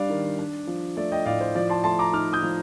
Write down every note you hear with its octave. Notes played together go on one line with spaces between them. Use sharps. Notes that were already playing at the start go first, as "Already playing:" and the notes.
Already playing: G3 D4 D5 F5
D#3
D4
F3
A3 D5
D#5 G5
A2 D5 F5
C5
F3 D5
A5 C6
A3 A5 C6
A#5 D6
D#4 D6 F6
D#6 G6
F3